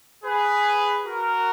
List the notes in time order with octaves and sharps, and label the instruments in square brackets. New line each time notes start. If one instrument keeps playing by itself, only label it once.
[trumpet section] G#4 B4
F#4 A#4